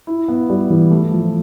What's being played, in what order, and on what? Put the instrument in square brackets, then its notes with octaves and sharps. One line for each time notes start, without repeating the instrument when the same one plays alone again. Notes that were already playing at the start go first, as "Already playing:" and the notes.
[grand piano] E4
B3
G3
E3
A3
F3